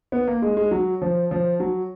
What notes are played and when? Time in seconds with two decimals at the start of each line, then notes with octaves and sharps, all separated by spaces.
0.12 B3
0.27 A#3
0.42 G#3
0.57 G#3
0.71 F#3
1.02 F3
1.31 F3
1.60 F#3